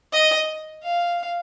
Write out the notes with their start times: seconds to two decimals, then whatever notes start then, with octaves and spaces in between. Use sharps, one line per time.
0.13 D#5
0.83 F5